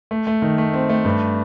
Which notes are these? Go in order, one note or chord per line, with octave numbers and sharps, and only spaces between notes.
A3
A3
D#3
A3
C4
A3
G2